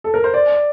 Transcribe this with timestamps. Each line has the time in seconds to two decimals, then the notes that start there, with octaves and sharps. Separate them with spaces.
0.04 A4
0.14 A#4
0.24 C5
0.34 D5